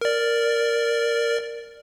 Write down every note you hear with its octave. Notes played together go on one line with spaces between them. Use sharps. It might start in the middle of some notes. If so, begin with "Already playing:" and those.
A#4 D5